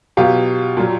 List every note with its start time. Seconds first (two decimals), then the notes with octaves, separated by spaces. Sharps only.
0.17 B2 F#3 F4 G4
0.77 A#2 F#3